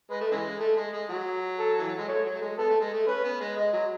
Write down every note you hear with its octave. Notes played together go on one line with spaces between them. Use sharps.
G#3 B4
A3
C#3 E3 G#3
A3 A4
G#3
G#3
F#3 F#4
A4
E3
F#3
G#3
A3 C#5
F#3
A3
G#3
B3 A4
A3
G#3
A3
C#4 B4
B3
G#3
G#3 D#5
F#3